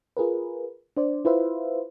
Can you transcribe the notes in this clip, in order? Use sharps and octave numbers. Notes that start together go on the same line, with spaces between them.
F4 G#4 A#4 B4
D4 C5 D5
E4 F4 B4 C5 E5 F5